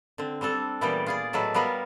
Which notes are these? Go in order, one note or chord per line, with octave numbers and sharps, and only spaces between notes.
D3 C4
G3 C4 D4 A4
A#2 E3 G3 B3 D5 G5
F4 G#4 D5
A2 F#3 G#3 A4 B4
G3 B3 F4 A#4 B4